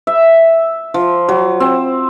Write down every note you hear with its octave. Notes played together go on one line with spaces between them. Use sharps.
E5
F3
F#3
C4